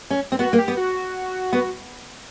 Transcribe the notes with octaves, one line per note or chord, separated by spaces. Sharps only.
C#4
C4
B3 F#4
A#3
G4
B3
F#4
B3